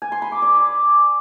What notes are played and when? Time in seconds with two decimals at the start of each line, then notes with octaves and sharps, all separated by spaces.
0.02 G#5
0.12 C6
0.22 B5
0.32 D6
0.42 D5